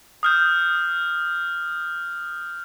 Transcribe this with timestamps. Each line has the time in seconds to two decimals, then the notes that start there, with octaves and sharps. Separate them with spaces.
0.23 D#6 F6 G6